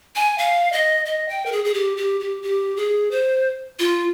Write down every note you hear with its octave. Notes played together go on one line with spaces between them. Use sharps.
G#5
F5
D#5
D#5
G5
A#4
G#4
G#4
G4
G4
G4
G4
G#4
C5
F4